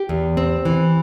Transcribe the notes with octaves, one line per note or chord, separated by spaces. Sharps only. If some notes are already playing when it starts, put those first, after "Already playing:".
Already playing: G4
E2
C4
E3